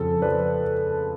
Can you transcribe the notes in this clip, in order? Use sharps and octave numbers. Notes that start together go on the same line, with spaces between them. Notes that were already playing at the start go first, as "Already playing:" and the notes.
Already playing: F2 C#3 A4
F3 B4 D5